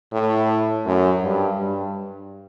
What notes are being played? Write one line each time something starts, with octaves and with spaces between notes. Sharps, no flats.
A2
F#2
G2
G2